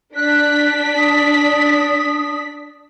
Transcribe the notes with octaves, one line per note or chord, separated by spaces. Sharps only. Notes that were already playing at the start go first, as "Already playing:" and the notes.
D4 F#6 B6
D#6